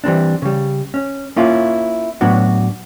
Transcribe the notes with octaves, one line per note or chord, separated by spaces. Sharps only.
E3 G3 C4 D4
C#3 G3
C#4
A#3 C#4 E4 F4
A2 F#3 B3 D4 F#4